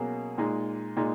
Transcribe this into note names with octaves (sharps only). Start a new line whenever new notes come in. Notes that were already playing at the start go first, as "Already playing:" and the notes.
Already playing: B2 F#3 A#3 C#4 G#4
A#2 G#3 D#4
A#2 G#3 D#4